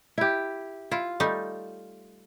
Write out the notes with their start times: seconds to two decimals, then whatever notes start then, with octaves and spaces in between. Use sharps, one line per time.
0.18 E4 G4
0.91 E4 F4
1.20 G3 A3 D#4